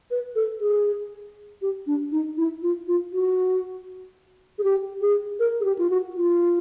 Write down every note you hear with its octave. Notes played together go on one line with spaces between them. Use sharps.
B4
A4
G#4
G4
D4
D#4
E4
F4
F4
F#4
G#4
G4
G#4
A#4
G#4
G4
F4
F#4
F4